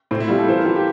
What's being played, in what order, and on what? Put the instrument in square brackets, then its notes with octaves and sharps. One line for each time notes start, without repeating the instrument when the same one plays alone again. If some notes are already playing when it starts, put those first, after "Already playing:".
[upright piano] A2 [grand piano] C4
[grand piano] E4
[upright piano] G3 [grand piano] F4
[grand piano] A4
[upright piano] E3 [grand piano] C5
[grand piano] A#4
[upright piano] E3 [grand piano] F4
[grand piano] G4